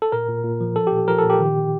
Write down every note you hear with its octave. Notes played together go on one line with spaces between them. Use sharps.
A4
A#2 A#4
A#2
A#2
F3
F3 A4
G4
A#2
F3 A#4
A4
A#2
G4
D#3